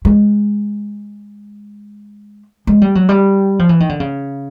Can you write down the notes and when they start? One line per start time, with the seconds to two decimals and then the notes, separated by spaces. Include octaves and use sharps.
0.05 G#3
2.67 G#3
2.82 G3
2.95 F#3
3.09 G3
3.59 F3
3.69 E3
3.80 D#3
3.89 D3
4.00 C#3